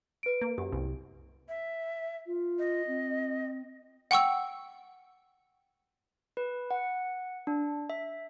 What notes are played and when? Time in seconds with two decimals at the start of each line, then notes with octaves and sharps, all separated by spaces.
0.23 B4 D7
0.42 A#3
0.58 F#2 G4
0.72 C2
1.49 E5
2.26 F4
2.59 D#5
2.87 C4
4.11 F#5 G5 C#6 E6
6.37 B4
6.71 F#5
7.47 D4
7.90 E5